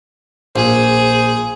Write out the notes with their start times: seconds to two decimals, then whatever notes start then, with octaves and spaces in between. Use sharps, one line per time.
0.56 A#1 G#4 C5